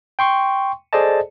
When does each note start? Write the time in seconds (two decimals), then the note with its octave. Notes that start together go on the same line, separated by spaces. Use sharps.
0.19 G5 C6 C#6
0.93 G#4 A4 C5 D5 D#5 A5